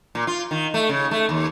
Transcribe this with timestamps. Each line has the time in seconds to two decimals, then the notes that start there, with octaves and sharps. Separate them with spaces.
0.15 A#2
0.27 F4
0.51 D#3
0.74 A3
0.89 C#3
1.11 A3
1.29 D#2